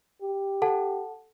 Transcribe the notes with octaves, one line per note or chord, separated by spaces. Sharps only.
G4
A4 F#5 A5